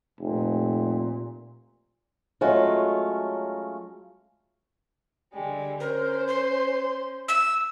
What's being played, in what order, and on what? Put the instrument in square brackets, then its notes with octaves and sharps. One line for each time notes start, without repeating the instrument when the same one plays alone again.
[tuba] F1 [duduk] A#2
[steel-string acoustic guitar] F#3 G#3 A3 C#4 F4
[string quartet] D3 G3 G#3
[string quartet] C#4 C5 [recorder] A#4
[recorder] C6
E6